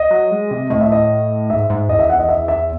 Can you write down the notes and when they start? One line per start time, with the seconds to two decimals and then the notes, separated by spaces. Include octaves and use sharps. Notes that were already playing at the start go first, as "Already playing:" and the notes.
Already playing: D#5
0.11 F#3
0.31 G#3
0.51 C3
0.70 A2 D#5
0.81 E5
0.92 D#5
1.50 G#2 E5
1.70 G#2
1.89 E2 D#5
1.99 E5
2.09 F#5
2.19 D#5
2.29 E5
2.48 E5